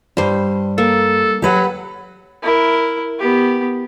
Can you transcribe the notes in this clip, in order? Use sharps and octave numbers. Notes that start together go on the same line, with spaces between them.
G2 G3 C5
A#3 A4
F#3 G4 B4 F#5
E4 A#4
B3 G4